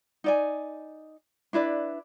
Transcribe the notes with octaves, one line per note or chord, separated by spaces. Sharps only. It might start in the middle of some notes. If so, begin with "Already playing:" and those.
D#4 D5 G#5
D4 E4 B4 D5